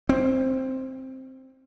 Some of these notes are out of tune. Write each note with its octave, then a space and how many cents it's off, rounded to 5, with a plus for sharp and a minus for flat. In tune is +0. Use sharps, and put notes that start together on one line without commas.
C4 +5